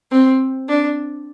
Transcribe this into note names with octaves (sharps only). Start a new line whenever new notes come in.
C4
D4